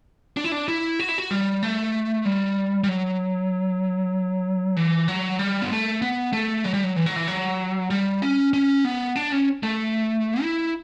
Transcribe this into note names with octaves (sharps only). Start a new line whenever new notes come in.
D4
E4
D4
E4
F#4
E4
F#4
G3
A3
G3
G3
F#3
E3
F#3
G3
B3
A3
B3
A3
F#3
G3
F#3
E3
F#3
E3
F#3
G3
C#4
C#4
B3
D4
C#4
A3
E4